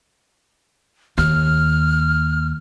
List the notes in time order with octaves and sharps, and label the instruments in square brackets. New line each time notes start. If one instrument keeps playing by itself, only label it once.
[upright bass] D#2 [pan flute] F6